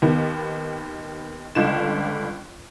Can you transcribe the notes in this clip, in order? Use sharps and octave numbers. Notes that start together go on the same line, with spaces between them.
D#2 D#3 B3
G1 C#2 D3 E7